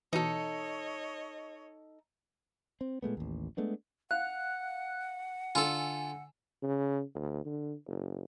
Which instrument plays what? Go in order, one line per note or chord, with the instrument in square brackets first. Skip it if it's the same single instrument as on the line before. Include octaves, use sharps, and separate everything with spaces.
[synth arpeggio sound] B2 E3 [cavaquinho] D#4 A4 [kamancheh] C#5 D#5
[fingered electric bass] C4
A#2 G#3 A3 B3
A1 D#2
G#3 A3 B3 D4
[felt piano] F5 [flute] F#5 [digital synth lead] F#6
[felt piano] D3 E6 [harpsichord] F4 A4 [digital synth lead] G#5
[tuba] C#3
D2
D3
F#1